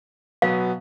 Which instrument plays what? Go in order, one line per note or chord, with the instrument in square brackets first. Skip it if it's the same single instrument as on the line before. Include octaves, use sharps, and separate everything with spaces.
[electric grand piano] B2 F#3 B3 [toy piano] F5